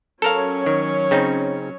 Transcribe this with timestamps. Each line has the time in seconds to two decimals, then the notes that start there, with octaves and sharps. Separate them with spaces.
0.22 F#3 C#4 A4 A#4 C#5 F5
0.66 D#3
1.11 C#3 C4 D#4